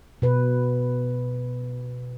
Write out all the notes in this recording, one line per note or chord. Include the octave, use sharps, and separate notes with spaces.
B2 B4